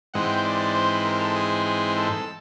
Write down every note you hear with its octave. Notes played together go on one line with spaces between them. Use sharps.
G#2 E3 G#3 C4 F#5
G5
D5
D5
C5
B4
A#4
A4
G#4
G#4
A4